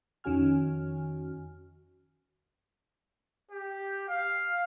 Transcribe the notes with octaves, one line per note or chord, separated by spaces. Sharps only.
F2 D#3 C#4 F#4 G#5 F6
G4
F5